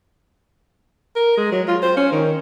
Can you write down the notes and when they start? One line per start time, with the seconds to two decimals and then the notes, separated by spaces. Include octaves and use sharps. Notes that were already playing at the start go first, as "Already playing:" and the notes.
1.16 A#4
1.37 G#3
1.52 F#3
1.68 F4
1.82 C5
1.97 C#4
2.12 D#3